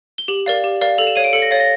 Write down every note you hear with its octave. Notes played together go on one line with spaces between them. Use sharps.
G7
G4 F#7
A#4 D5 F5
G4
A#4 D5 F5
A4 F7
E7
C#5 F5 D#7
D7
A4 C#7
A#6
C#5 F5 A6
A#6